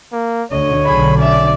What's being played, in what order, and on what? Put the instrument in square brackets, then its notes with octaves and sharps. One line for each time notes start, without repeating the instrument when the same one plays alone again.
[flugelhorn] A#3
[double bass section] D2 D3 [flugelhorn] C#5 [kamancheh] D#5
[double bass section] B1 D3 [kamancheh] G#4 B5
[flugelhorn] C#4 [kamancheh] D5 E5